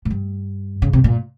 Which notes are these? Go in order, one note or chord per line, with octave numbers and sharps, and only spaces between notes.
G#2
G2
C#3
C3
A#2